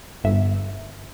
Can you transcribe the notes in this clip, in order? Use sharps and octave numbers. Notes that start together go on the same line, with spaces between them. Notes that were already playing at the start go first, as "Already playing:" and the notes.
G1 E5